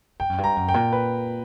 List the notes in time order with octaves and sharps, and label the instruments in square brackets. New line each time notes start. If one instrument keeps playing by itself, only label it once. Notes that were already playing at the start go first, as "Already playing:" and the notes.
[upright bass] G2 [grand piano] G5
[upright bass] F#2
G2
[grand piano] A#5
[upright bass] F#2
[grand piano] G5
[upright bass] A#2
[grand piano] B4